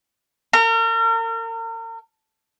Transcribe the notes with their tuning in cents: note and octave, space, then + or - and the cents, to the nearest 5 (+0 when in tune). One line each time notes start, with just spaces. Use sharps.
A#4 -40